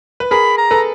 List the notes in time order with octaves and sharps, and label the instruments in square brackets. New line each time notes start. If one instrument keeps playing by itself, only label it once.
[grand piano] B4
[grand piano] G#4 A#4 [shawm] B5
[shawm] A#5
[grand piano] A4 B4